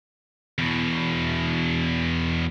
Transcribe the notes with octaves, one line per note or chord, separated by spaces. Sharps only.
E2 B2